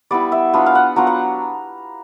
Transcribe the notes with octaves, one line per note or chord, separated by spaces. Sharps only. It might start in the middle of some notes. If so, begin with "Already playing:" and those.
G3 B3 E4 D5
E5
F#3 B3 D4 F4
F5
F#5
F#3 B3 D4 F4 A#5
F#5